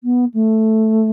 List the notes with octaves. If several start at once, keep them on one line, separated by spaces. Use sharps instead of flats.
B3
A3